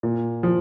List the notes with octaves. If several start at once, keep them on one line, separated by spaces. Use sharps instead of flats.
A#2
F3